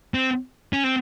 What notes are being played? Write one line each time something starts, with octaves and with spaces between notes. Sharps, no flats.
C4
C#4
C4